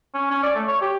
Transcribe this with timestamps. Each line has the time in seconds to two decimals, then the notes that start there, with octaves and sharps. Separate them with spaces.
0.14 C#4
0.30 C#4
0.43 D5
0.55 A3
0.68 C#5
0.81 G4